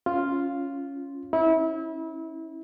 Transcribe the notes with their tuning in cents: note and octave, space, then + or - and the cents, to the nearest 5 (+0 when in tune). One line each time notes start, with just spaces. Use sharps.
C#4 +0 F4 +0
C#4 -20 E4 -30